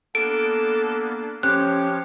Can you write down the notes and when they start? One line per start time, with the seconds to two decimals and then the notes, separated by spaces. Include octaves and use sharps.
0.15 A#3 B3 D4 A4 D7
1.43 F3 C#4 G4 C5 C#5 F#6